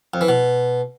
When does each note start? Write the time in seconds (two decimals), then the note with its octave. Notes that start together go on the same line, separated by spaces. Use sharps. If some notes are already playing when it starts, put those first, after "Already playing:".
0.14 F2
0.21 E3
0.28 B2